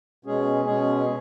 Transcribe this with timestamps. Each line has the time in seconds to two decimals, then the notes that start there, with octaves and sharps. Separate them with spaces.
0.25 B2 G#3 C#4 G#4
0.65 B2 G#3 C#4 G#4